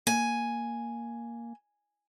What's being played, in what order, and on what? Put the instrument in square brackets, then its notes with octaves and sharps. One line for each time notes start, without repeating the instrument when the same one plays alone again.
[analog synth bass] A#3 [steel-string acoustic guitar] G#5